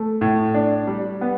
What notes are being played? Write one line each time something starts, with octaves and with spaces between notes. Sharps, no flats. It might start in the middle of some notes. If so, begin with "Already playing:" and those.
Already playing: A3
A2
D4
G3
B3